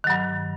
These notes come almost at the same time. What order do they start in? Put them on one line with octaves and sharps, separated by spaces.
D#3 F#3 G2